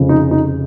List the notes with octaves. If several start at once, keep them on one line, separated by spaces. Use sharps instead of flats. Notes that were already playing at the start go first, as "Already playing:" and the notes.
Already playing: F1 F2 C#3
D#4
D#4